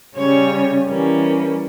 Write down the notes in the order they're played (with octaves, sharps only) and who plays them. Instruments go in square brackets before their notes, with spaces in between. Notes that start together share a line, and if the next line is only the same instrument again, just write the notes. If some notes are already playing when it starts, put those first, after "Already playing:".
[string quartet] C#3 G3 C#4 C#5
E3 G3 A#3 C#4